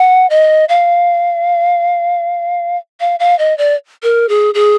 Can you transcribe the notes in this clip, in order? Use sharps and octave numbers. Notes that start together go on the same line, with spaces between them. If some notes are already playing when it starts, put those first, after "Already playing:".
Already playing: F#5
D#5
F5
F5
F5
D#5
D5
A#4
G#4
G#4